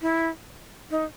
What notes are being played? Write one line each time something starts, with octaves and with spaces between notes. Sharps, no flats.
E4
D#4